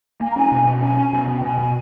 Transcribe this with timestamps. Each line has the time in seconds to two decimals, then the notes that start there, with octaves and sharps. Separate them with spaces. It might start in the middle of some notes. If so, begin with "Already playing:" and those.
0.20 A#3 G#5
0.28 A#5
0.36 C#4 G#5
0.52 B2
0.67 B2
0.82 C#4 G#5
0.97 C#4
1.13 B2
1.28 B2
1.37 G5
1.42 B2 G#5
1.59 B2